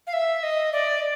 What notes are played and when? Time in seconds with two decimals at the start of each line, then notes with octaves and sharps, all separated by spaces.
0.07 F5
0.13 E5
0.43 D#5
0.73 D5